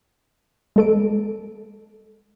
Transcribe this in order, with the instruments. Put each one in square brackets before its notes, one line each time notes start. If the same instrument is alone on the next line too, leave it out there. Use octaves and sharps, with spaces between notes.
[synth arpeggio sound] G#3 A4 D7